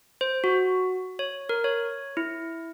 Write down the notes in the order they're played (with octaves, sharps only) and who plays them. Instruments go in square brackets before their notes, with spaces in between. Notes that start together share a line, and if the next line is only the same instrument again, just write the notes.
[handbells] C5
F#4
C#5
A#4
C#5
E4